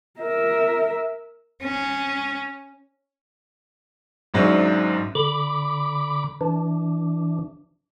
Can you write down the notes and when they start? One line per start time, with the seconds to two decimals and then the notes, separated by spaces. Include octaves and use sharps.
0.20 A#4 E5
1.63 C#4
4.34 G#1 G#2 F#3 C#4 D4 E5
5.15 D3 B5 D6
6.41 E3 D4